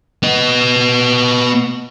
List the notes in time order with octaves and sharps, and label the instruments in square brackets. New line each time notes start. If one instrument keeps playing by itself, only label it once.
[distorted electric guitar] B3 D#5